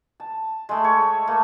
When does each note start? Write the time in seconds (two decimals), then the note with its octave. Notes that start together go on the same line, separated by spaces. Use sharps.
0.20 A5
0.69 G#3 A3
0.84 C#5
1.27 A3 A#3